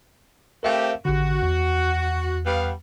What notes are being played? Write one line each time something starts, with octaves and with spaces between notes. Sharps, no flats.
A3 C4 G4 A#4 E5 F5
A1 D3 F#4
E2
G3 B3 F5